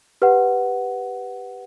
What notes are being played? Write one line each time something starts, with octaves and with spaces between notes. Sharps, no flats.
G4 B4 F#5